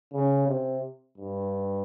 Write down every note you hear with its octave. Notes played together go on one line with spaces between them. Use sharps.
C#3
C3
G2